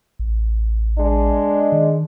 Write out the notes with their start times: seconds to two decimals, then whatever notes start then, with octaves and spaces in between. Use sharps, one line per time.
0.19 A1
0.98 G#3 D4
1.72 D#3